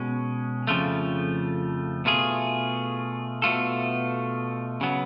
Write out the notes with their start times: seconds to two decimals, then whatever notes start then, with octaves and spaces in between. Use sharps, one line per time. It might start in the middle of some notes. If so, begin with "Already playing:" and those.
Already playing: B2 G#3 C#4
0.67 F2 C#3 F3 A3 F4
2.05 B2 A3 F4 G#4
3.42 B2 A3 F4 A4
4.81 C#3 F#3 B3